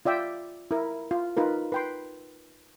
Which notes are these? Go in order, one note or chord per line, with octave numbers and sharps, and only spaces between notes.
F4 D5 E5 G5
E4 A#4
F4
D#4 F4 A#4 B4
B4 G5 C6